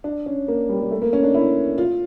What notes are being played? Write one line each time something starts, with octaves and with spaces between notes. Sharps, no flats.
D4
C#4
A#3
G3
G3
A3
A#3
C#4
D4
E4
F4